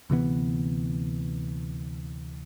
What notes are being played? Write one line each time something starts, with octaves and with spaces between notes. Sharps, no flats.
D2 C3 E3 B3